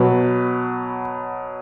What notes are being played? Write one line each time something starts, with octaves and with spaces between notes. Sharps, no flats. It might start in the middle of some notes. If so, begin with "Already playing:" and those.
Already playing: B2 F#3 B4